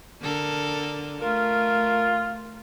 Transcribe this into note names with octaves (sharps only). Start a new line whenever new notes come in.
D3 A4 A#4
A3 F4 A#4